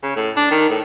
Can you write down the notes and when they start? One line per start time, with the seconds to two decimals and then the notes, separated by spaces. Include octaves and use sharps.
0.03 C#3
0.16 A2
0.36 D4
0.51 D#3
0.69 A2